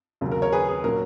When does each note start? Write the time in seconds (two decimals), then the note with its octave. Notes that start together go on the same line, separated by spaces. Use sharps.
0.21 D#2 C#3 F#3
0.32 A#4
0.42 A#4 C#5
0.53 G#4 B4
0.68 G#4
0.84 A#2 F#3 C#4 A#4